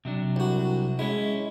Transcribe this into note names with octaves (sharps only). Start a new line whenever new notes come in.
C3 F#3 D4
C2 F#4
G#3 C#4 E4